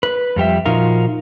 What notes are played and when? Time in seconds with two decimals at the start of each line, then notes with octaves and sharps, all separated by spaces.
0.03 B4
0.36 F2 G3 G4 E5
0.65 A#2 F3 D#4 F4 F#4 A#4